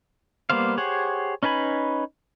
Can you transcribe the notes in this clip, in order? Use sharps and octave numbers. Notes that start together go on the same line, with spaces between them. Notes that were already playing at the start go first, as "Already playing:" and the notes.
G3 A#3 B3 C5 F5
G4 G#4 C5 C#5 F#5
C#4 D#4 B4 G#5 B5